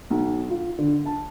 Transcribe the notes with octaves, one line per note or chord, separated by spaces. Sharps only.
B1
F4
D3
A5